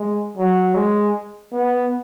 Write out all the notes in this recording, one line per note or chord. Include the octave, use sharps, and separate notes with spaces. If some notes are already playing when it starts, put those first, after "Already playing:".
Already playing: G#3
F#3
G#3
B3